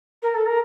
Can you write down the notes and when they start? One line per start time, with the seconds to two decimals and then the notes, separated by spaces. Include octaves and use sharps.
0.22 A#4
0.34 A4
0.46 A#4